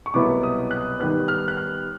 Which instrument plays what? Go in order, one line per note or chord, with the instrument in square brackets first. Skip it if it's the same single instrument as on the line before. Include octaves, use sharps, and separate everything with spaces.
[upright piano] C#6
C2 B2 F#3 B3 E4 D6
D#6
F#6
D#2 D#3 G3 B3 F#6
F6
F#6
F6